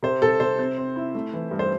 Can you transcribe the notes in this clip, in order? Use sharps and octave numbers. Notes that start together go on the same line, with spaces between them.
C3 C5
C3 A4
C3 C5
C4
C4
E4
A3
E3
G2
C5